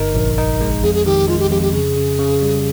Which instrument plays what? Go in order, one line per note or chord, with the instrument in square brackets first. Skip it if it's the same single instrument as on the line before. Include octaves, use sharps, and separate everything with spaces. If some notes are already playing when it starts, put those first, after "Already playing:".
Already playing: [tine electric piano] G1 D#4 [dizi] A#4
[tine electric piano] A#1
D#4
G#3
[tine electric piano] F2 [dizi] G#4
[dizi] G#4
[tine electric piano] D#3 [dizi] G4
[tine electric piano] G#3 [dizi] F4
[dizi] G4
[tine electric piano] F2 [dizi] G4
[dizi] G4
[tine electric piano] C#3 [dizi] G#4
[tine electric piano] C#3
C#3
G3